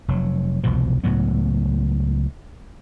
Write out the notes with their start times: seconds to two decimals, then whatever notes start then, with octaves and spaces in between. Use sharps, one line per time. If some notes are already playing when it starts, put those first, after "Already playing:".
0.08 F1 F#3
0.64 E1 C2 B2 F3
1.04 C#2 A2 F#3 B3